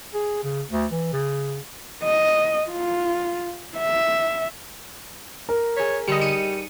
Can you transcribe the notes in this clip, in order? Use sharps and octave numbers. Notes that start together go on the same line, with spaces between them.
G#4
C#3
D2
E3
C#3
D#5
F4
E5
A#4
G#4 C#5 B6
D3 G3 D#5 C#7
D#4 C#7 D#7